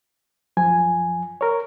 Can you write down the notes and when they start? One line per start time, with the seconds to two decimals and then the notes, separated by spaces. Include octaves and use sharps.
0.57 F#2 F3 G#5
1.41 A#4 C#5